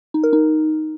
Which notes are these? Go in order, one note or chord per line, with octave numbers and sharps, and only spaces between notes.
D#4
A#4
D#4